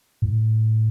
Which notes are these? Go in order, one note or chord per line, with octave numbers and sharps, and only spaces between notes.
A2